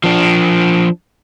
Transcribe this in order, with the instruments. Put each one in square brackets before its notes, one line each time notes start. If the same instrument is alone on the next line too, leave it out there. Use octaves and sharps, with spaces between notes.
[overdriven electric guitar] F3 D4